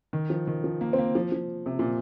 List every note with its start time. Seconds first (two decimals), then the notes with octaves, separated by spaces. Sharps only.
0.13 D#3
0.30 F3
0.47 D#3
0.64 F3
0.81 A#3
0.93 C4
0.98 A#3
1.15 F3
1.32 F3
1.66 C3
1.79 A#2